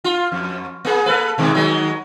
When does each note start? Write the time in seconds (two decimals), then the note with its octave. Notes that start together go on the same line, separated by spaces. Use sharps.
0.04 F4
0.32 F2
0.85 A#3 G#4
1.06 A#3 A4 B4
1.38 B2 D#3 G#3
1.54 D#3 F#3 G#3